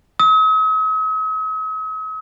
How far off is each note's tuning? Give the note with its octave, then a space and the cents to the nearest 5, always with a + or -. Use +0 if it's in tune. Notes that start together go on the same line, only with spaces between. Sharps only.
D#6 +45